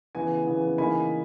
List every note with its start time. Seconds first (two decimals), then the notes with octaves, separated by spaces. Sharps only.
0.15 C#3 E3 B3 G#5
0.46 C#3 E3 B3
0.78 C#3 E3 A#3 D#4 G#5 B5